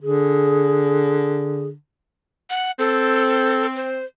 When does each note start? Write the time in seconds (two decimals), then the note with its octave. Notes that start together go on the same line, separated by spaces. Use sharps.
0.01 D3 G#4
2.50 F#5
2.79 C4 A4
3.76 C5